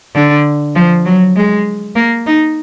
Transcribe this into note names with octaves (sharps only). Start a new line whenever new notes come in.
D3
F3
F#3
G#3
A#3
D#4